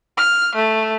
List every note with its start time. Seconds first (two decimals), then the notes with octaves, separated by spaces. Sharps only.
0.17 F6
0.55 A3